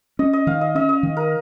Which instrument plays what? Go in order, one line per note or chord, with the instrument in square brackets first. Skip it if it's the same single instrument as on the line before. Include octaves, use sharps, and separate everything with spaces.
[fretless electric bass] C#4 [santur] D#5
[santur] D#5
[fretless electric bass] D#3 [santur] F5
[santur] D#5
[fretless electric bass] C#4 [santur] D#5
[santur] D#5
[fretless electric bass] D#3
[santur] A#4